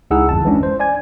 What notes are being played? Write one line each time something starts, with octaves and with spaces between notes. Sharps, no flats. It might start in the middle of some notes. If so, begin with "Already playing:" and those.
C#2 D#4 E4 G#4 F#5 E6
G1 F2 A5
E3 G#3 C#4 D4
C5
D5 G#5 G#6